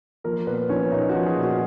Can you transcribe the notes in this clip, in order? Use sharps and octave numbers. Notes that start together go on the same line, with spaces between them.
F3 A#3 A#4
A#2 B3 B4
F3 C#4 C#5
A#2 D#4 D#5
F#4 F#5
F3
G#4 G#5
A#2
F#4 F#5